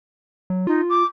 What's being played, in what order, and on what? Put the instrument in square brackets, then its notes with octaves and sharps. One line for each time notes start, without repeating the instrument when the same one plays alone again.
[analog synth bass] F#3
[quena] D#4 [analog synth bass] F4
[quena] D6